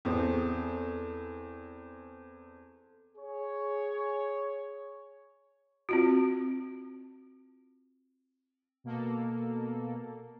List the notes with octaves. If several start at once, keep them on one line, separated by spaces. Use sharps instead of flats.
E2 C4 A4 C5 D#5
G#4 C#5
C4 F4 F#4
B2 A#3 A4